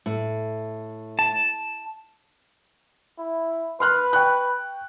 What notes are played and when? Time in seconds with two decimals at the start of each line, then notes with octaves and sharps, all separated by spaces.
0.06 A2
1.19 A5
3.19 E4
3.80 B4 C6 F6 F#6
4.13 G5 C#6 F#6